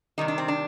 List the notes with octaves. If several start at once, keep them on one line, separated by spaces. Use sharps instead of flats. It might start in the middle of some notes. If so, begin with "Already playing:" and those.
C3 D#3 G3 D#4
D4
C4
D4